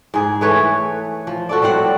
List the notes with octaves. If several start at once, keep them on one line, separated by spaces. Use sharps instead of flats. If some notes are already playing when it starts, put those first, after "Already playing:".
G#2 G#4
E3 A3 B4 C#5
F3
F#4 A4 D5
A2 G3 C4 F#5